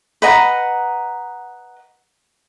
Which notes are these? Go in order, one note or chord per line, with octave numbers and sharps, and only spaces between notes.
B4 D#5 F#5 A#5